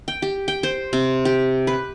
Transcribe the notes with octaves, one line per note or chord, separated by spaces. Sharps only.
G5
G4
G5
C5
C3
G4
B4